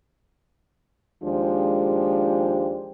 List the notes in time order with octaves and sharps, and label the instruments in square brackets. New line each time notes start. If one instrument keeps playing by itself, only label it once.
[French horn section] D#2 F3 G#3 D4 G4 C5